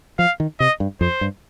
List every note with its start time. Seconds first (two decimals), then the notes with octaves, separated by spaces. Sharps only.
0.19 F3 F5
0.40 D#3
0.60 C3 D#5
0.80 G2
1.01 F2 C5
1.21 G2